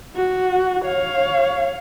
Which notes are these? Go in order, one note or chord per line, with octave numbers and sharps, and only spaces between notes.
F#4
C#5 F5